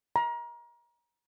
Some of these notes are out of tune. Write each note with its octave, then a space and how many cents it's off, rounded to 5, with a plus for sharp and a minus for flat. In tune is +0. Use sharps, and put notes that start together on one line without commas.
A#5 +30